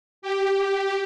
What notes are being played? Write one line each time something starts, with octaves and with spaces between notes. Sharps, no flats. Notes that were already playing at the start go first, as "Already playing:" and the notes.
G4